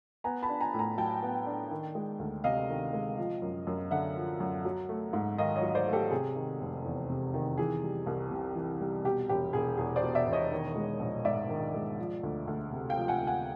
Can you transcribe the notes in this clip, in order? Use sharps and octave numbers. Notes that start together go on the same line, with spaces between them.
B3 G#5 A#5
A5 B5
D4
G#5 A#5
A2
G#5 A#5
F#3 G5 A5
B3
D4
D#3
G#3
D2
C3 D#5 F5
D#3
G#3
F3
F#2
F#2
D3 E5 F#5
F3
F#2
F#3
A3
G#2
D#3 D#5 F5
C#5 D#5
F#3
D#5
C5 D5
A3
G4 A4
C3 G#4
D#3
F1
E2
C3
D#3
E3 G#4
G3
C2
C3
E3
G3
B2 G4
E1 G4
E1 G#4
E2 G#4
C5 D5
B2
D5 E5
E1
C#5 D#5
D#3
G#3
A#1
G#2 D5 E5
D#3
G#3
F3
D2
D2
C3
F5 G5
F3
F#5 G#5
D2
F#5 G#5